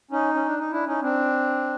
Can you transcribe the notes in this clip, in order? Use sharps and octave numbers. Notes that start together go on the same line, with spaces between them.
C#4 D#4
C#4
D4
D#4
D4 E4
C#4 D#4
C4 D4